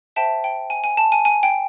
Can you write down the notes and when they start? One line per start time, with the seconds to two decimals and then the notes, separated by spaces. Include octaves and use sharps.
0.16 C5 E5 G5 A5
0.44 G5
0.70 G#5
0.84 G#5
0.97 A5
1.12 G#5
1.25 G#5
1.43 G5